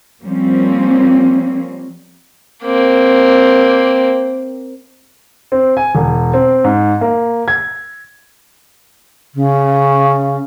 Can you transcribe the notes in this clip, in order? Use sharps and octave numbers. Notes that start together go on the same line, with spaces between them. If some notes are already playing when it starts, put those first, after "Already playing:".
F3 G3 A#3 C4 C#4
A#3 C4
C4
G#5
E1
C4
G#2
A#3
G#6
C#3